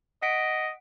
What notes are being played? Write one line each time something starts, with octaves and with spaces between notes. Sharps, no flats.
D#5 F#5 B6 D7